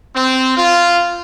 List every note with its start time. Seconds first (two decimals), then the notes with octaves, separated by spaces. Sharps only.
0.14 C4
0.56 F4